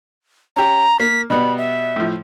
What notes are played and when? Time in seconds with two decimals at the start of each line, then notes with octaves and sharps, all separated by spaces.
0.56 C#4 G4 A#5
1.00 A#3 B6
1.30 B2 G3 B3 B5
1.58 E5
1.96 A2 F3